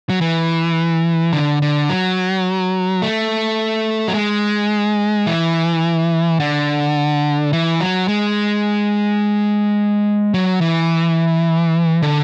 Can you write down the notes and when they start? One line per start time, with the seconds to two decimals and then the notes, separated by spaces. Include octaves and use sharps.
0.10 F#3
0.21 E3
1.33 D3
1.62 D3
1.89 F#3
3.02 A3
4.08 F#3
4.14 G#3
5.27 E3
6.40 D3
7.53 E3
7.81 F#3
8.08 G#3
10.34 F#3
10.61 E3
12.02 D3